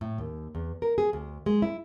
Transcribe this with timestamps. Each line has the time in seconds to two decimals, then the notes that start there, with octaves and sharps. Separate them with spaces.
0.01 A2
0.18 D#2
0.55 E2
0.82 A#4
0.98 G#4
1.13 D2
1.46 G#3
1.62 E4